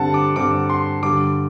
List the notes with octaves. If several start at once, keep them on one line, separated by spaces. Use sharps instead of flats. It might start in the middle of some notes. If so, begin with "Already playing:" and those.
Already playing: G2 D3 G3 C4 F#5 A5
D6
G2 D3 G3 C4 D6
C6
G2 D3 G3 D6